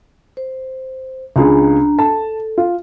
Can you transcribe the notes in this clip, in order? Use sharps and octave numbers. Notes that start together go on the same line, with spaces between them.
C5
C#2 D4 F4 G#4 A#5
A4 A5
F4